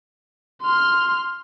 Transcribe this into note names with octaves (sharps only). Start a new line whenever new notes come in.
C6 F6